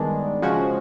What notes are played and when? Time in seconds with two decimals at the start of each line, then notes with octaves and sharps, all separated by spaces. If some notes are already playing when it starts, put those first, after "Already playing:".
Already playing: G2 D#3 G#3 B3 D4
0.42 C#3 F3 G#3 C#4 F#4